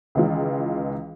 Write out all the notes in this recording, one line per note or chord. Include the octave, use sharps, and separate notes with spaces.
C#2 D#3 E3 G#3 F4